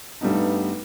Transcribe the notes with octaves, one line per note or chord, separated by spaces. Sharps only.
G2 G3 A3 B3 D#4